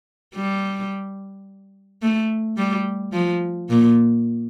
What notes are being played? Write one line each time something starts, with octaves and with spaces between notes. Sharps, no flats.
G3
A3
G3
F3
A#2